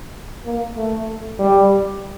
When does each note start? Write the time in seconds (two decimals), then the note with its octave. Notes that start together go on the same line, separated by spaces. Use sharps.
0.45 A#3
0.76 A3
1.39 G3